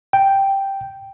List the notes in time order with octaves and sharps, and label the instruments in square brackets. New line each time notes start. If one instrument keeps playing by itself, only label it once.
[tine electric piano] G5